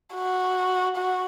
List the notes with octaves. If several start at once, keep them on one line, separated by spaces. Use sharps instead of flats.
F#4
F#4